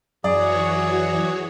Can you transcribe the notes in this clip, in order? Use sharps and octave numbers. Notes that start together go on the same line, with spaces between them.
F#2 E3 F#4 G#4 C#5 D5